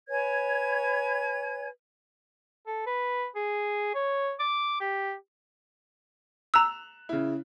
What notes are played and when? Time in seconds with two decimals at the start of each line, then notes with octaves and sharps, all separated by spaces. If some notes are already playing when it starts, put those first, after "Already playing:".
0.09 B4 C#5 G#5 G#6
2.67 A4
2.86 B4
3.35 G#4
3.95 C#5
4.40 D6
4.81 G4
6.54 A#5 E6 F#6 E7 F7
7.09 C#3 E4